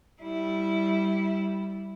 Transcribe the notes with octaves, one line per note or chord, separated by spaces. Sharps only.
G3 E4